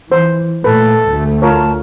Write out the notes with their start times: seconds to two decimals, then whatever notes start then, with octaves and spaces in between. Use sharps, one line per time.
0.12 E3 C5
0.64 A#2 A3 A4 B4
1.09 D2 A3
1.42 F4 A#4 C#5 A5